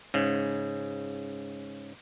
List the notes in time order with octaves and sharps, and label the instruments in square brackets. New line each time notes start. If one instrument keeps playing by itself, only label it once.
[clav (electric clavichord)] G#2 C#3